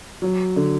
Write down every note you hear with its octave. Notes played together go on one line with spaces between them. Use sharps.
F#3
D3